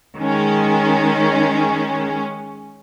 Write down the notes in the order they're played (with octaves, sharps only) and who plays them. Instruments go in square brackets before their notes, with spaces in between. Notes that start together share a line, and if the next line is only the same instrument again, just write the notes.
[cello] D#3 [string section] G#3 C#4